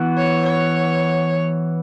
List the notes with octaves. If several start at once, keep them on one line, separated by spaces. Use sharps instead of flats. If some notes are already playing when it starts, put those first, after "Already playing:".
Already playing: E3 B3 F#4
C#5
C#5